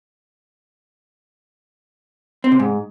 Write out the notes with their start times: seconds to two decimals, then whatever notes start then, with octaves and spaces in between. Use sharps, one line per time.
2.44 C4
2.52 C3
2.59 G#2